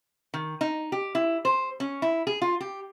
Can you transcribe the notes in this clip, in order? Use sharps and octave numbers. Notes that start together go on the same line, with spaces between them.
D#3
D#4
G4
E4
C5
C#4
E4
G#4
F4
G4